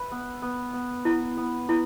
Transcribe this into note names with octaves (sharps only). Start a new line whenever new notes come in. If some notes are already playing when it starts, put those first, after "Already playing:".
Already playing: B4 E5
B3
B3
B3
B3 E4
B3
B3 E4